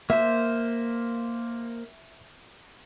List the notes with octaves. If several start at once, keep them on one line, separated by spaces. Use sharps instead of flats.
A#3 C5 E5